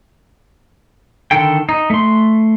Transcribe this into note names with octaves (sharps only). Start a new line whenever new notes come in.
D3 D#3 A4 G5
D#4
A3 C6